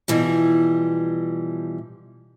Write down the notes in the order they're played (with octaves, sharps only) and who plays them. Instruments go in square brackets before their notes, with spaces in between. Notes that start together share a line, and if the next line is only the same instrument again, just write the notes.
[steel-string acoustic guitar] B2 E3 F3 G3